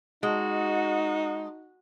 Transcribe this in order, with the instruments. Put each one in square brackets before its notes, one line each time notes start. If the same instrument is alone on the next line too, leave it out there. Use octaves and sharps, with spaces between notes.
[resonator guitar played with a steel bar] G#3 [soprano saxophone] D#4 [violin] F#4